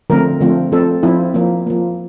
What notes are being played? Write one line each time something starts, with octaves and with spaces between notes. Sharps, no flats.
D3 F3 A3 C4 A#4
D3 F3 A3 C4
F3 C4 A4
F3 C4 E4
F3 A#3
F3 A#3